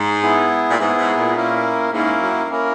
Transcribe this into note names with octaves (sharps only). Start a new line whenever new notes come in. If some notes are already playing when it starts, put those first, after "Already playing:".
Already playing: G#2
B3 E4 G#4
A#2
G#2 B3 E4 G#4
G#2
A#2
A#3 C#4 E4 A#4
G#2 A#3 C#4 E4 A#4
F#2
A#3 C#4 E4 A#4